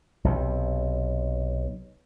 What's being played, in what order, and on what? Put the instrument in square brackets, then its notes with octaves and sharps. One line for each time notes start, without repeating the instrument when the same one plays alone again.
[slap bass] B1 C3